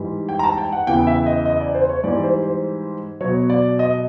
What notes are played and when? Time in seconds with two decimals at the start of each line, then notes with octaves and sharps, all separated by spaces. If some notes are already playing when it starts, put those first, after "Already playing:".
Already playing: G#2 E3 G3
0.29 G5
0.39 A#5
0.43 A5
0.58 G5
0.73 F#5
0.87 E2 C#3 E3 G5
1.07 E5
1.26 D#5
1.46 D#5
1.60 D5
1.75 C5
1.89 C#5
2.04 G#2 E3 G3 D5
2.23 C5
2.43 C5
3.21 B2 F#3 C#5
3.50 D5
3.79 D#5